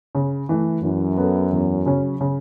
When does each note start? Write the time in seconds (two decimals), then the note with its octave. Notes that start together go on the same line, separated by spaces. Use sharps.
0.15 C#3
0.49 E3 A3
0.83 F#2 E3
1.18 B3 A4
1.52 E2
1.86 C#3 F#3 C#4
2.21 C#3